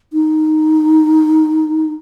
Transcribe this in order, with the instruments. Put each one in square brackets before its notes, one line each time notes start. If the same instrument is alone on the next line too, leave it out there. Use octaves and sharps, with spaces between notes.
[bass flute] D#4